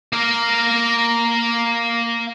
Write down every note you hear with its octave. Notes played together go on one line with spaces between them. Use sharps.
A#3 A#4